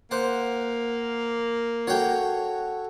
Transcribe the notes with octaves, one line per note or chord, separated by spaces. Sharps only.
A#3 C5 F#5
F#4 A4 C#5 F#5 G5